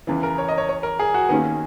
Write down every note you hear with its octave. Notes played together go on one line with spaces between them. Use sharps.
E2 C#3 E3
A#4
C#5
D#5
C#5
C#5
A#4
G#4
F#4
D#2 D#3 A#3 B3 C#4 G#4